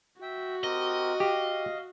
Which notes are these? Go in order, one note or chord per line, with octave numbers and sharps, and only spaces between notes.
F#4 E5 G5
C4 G4 A#4 D#5
G4 F5